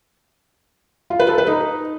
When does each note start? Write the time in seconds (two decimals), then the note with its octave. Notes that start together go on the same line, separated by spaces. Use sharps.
1.10 F4
1.20 B4
1.29 A4
1.38 B4
1.47 D#4